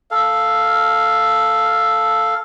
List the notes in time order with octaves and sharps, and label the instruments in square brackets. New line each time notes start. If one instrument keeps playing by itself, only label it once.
[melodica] A4 F5